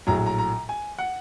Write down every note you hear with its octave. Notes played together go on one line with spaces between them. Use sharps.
A#1 A2 F#3 A#5
A#5
A#5
G#5
F#5